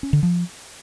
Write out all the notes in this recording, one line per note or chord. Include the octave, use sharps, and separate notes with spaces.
C#4
D3
F3